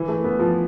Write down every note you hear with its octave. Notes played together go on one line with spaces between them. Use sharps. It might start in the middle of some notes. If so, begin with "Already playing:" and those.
Already playing: E3
A3
B3
F3